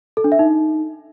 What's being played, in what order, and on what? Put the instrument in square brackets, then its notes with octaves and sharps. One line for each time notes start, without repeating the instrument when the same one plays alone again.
[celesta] A4
D4
E5
D#4